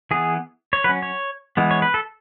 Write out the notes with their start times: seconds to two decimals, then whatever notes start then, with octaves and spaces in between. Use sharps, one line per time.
0.11 E3 B3 G#4
0.73 C#5
0.84 F#3 C#4 B4
1.02 C#5
1.57 E3 G#3 B3
1.71 C#5
1.82 B4
1.94 A4